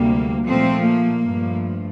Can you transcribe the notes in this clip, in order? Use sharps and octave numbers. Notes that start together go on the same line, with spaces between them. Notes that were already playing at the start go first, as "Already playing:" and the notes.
Already playing: D2 C3 G3 A#3
A#2 F3 A3 C4
A#3
G2 F3 A3